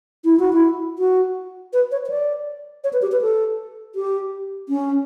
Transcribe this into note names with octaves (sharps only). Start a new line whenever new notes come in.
E4
F#4
E4
F#4
B4
C#5
C#5
D5
C#5
B4
G4
B4
A4
G4
C#4